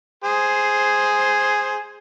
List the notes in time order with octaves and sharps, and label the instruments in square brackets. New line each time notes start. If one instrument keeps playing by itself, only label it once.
[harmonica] G#4 C5